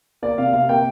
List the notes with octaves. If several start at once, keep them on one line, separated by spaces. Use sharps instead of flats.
A#3 D5
C3 F5
C3 F5
A#3 G5